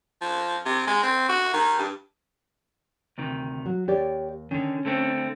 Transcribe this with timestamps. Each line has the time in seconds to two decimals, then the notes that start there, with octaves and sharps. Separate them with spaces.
0.21 F3
0.66 C3
0.87 G#3
1.03 C4
1.29 F#4
1.53 D#3
1.79 G2
3.18 D2 C3 D#3
3.66 F#3 F#4
3.88 D#2 G4 C#5 D5
4.51 D3 D#3 C#4
4.85 D3 A3 C4